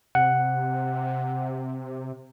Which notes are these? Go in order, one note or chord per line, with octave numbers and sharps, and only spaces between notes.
C3 F#5